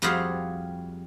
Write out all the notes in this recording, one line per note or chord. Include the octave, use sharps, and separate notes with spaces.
F2 G3 F#4 G#4 C5 F5